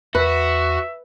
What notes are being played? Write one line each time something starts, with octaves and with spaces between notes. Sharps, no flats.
E2 F#4 B4 E5